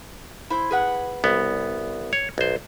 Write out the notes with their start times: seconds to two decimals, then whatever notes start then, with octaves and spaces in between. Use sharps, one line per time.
0.50 E4 C5
0.71 G#4 B4 F#5
1.24 C2 B3
2.13 C#5
2.38 B1 C5